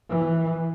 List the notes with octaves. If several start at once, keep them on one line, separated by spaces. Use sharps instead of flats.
E3